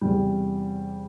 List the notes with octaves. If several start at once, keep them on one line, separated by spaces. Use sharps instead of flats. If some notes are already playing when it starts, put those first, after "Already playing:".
E2 C3 E3 G3